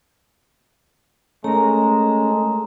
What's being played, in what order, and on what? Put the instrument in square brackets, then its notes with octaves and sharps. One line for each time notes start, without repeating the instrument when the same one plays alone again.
[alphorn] G#3 [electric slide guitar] A3 A#4 [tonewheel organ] C#4 A4 [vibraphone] A#5